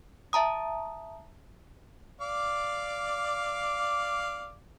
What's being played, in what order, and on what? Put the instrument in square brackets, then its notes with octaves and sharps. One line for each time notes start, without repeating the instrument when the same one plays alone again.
[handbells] E5 A5 A#5 D#6
[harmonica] D5 F5 D6